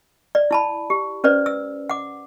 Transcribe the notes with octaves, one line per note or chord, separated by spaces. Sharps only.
D5
E4 A5 B5
G4
C#4 B4 C5 D5
E6
F#5 D6